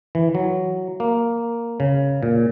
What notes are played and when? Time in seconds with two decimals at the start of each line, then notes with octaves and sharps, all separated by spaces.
0.15 E3
0.35 F#3
1.00 A#3
1.80 C#3
2.23 A#2